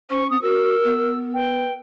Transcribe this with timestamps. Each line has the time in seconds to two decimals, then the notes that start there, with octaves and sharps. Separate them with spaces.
0.10 C#4 C5 C#6
0.30 C4 D#6
0.42 F#4 A#4 E6
0.84 B3
1.33 B4 G5